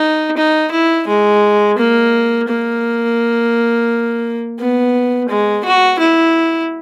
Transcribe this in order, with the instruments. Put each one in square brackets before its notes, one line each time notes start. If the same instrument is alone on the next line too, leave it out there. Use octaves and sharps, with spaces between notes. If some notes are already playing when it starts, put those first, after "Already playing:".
Already playing: [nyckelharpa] D#4
D#4
E4
G#3
A#3
A#3
B3
G#3
F#4
E4